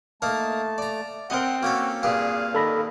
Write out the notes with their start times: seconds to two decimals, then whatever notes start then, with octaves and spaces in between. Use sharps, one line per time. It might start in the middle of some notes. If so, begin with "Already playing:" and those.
0.22 A3 A#3 D#4 A#4 A5
0.78 D5 A#5
1.30 C4 A#4 D#5 F#5
1.63 A#3 C#4 F#4 A4
2.03 G2 A#2 G4 G#4 F5
2.55 D#3 A4 B5 A#6